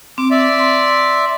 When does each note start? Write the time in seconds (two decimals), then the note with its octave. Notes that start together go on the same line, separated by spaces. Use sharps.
0.18 C4 D6
0.31 D5 E5
0.59 C6